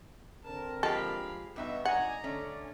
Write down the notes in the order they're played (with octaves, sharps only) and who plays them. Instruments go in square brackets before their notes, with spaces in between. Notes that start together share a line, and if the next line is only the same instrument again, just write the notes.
[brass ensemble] D3 C4 A#4 [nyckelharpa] A5
[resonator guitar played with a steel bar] F3 G#3 G4 [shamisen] A4 [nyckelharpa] F5 B5
[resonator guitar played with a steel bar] G2 B2 D#4 [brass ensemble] B3 [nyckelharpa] E5
[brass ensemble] G#1 D5 G#5 [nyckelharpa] D#5 A#5 [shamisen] F#5
[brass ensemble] D3 D5 [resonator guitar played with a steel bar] A3 C#4